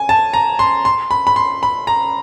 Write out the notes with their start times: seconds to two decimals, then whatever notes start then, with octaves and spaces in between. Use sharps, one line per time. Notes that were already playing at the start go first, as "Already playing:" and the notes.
Already playing: G#5
0.09 A5
0.34 A#5
0.59 C6
0.85 C6
1.11 B5
1.27 B5
1.36 C6
1.63 B5
1.87 A#5